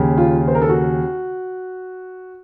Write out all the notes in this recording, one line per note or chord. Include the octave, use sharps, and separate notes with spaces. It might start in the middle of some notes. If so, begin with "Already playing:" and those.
Already playing: D#2 C#3
F4
C5
A#4
A4
F#4